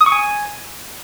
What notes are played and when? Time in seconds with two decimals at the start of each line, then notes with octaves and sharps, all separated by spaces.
0.01 D#6
0.06 C#6
0.12 G#5